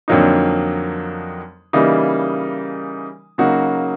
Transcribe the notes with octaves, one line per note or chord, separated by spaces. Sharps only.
F2 D3 F#3 A#3 D#4
C#3 E3 G3 A#3 D#4
C#3 F#3 A#3 D#4 F#4